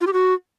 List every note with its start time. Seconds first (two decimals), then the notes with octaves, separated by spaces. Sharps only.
0.01 F4
0.07 G4
0.13 F#4